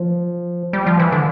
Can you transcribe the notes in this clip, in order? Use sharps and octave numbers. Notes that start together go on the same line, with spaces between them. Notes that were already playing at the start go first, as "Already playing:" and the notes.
Already playing: F3
G3
F3
E3
D3